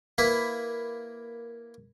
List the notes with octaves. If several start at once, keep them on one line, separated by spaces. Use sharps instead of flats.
A#3 E4 B4